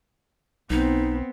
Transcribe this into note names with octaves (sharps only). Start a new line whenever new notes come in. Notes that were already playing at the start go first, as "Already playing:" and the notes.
B1 B3 C4 D#4